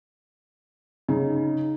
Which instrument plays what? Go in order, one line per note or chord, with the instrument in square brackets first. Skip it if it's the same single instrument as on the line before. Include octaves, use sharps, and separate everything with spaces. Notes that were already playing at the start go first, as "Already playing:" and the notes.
[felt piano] C#3 [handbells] D#4